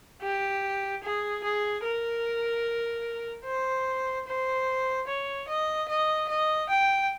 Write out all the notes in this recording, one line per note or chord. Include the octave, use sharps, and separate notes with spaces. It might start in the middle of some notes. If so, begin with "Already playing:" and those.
G4
G#4
G#4
A#4
C5
C5
C#5
D#5
D#5
D#5
G5